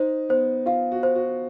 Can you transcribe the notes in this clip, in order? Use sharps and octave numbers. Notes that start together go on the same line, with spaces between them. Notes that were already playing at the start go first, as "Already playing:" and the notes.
Already playing: D#4 C5
B3 C5
F4 F5
F#4
C5
F#4